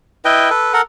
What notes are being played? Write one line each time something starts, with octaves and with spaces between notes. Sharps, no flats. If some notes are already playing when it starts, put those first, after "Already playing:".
E4 B4 D#5 G5
A4 B4
A4 A#4 F#5